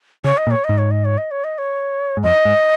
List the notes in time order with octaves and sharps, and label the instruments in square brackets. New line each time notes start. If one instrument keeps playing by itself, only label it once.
[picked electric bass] C#3 [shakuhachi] C#5
[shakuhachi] D#5
[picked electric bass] A#2
[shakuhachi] C#5
[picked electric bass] G#2 [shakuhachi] D#5
[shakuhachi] C#5
D#5
C#5
D#5
C#5
D#5
C#5
[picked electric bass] G#2
[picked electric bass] F2 [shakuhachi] D#5
[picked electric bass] G#2